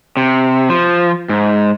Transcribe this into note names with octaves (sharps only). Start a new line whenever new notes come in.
C3
F3
G#2